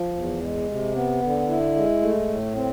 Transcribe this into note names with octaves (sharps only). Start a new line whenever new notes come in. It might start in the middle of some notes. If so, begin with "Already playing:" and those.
Already playing: F3
E2
G#3
C3
B3
D3
E4
G#3
A3
A2
C4